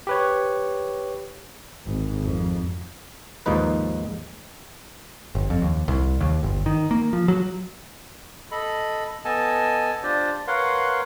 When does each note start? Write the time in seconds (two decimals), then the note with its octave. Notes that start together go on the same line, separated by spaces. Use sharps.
0.07 G4 B4 C#5
1.87 G#1
2.25 F2
3.46 D#2 G#2 F3 D#4 B4
5.35 G1
5.50 F2
5.62 D#2
5.88 C2
6.21 D#2
6.43 G1
6.66 D#3
6.91 A#3
7.13 F3
7.28 F#3
8.52 A4 D#5 B5
9.25 B3 A4 D#5 G#5 A5
10.03 D4 F4 G4 C5 D5
10.47 A#4 B4 C#5 F5 F#5 C6